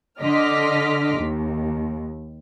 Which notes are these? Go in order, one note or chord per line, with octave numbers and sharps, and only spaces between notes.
D3 D#5 C6 D6 F6 B6
D#2